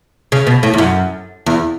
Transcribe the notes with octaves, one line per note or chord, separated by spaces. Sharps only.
C#3
B2
A2
E2
F#2
E2